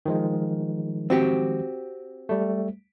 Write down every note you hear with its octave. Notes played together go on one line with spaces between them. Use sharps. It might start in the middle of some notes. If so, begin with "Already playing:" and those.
D#3 F3 G#3
C4 F#4 G4
G3 A3